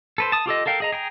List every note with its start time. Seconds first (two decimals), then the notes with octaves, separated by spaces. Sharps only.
0.18 A4 B4 C5
0.32 A5 D#6
0.46 F4 G4 A4 D#5
0.66 A4 A#4 F5 G5
0.80 G#4 D#5 A#5
0.92 G#4 G5 A#5